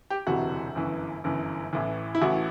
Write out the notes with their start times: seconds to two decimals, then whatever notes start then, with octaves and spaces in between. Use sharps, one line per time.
0.10 G4
0.27 E1 D2 C3 E3 F#4
0.75 G1 F#2 E3
1.24 G1 F#2 E3
1.73 A1 A2 E3
2.15 E4
2.21 A1 A2 E3 F#4